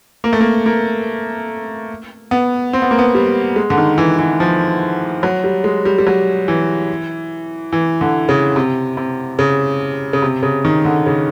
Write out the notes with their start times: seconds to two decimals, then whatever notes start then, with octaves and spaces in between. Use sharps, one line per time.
0.24 A#3
0.33 A3
0.40 A#3
0.66 A#3
2.31 B3
2.73 C4
2.82 B3
2.91 A#3
2.99 B3
3.15 G3
3.56 G#3
3.70 D3
3.78 D#3
3.98 E3
4.19 E3
4.40 F3
5.23 F#3
5.44 G3
5.64 G#3
5.85 G3
5.99 G3
6.07 F#3
6.48 E3
7.73 E3
8.01 D3
8.29 C#3
8.56 C3
8.97 C3
9.39 C#3
10.13 C#3
10.22 C3
10.43 C#3
10.65 D#3
10.85 D3
11.06 C#3